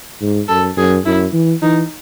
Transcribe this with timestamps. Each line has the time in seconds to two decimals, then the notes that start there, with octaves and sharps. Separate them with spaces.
0.21 G#2
0.48 F#2 A4
0.77 F#2 G#4
1.06 F#2 E4
1.33 E3
1.62 E3 D#4